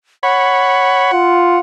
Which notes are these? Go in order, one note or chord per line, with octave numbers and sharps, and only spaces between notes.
C#5 F#5 B5
F4